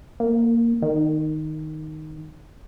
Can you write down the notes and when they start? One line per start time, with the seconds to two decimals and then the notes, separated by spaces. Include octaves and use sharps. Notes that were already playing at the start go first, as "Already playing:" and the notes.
0.20 A#3
0.82 D#3